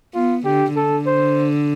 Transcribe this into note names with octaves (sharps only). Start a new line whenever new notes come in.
B3 F4
D3 G4
D3 A4
C5